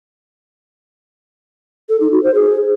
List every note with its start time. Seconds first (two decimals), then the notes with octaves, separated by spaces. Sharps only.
1.89 A4
2.00 D#4
2.12 F#4
2.23 C5
2.34 G#4